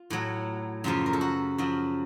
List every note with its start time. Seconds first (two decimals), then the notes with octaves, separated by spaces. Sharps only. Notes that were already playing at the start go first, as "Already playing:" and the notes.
Already playing: F4
0.10 A2 F#3
0.84 F#2 C#3 F3 F4
1.06 A#4
1.13 A4
1.21 F#4
1.58 F#2 F3 F#4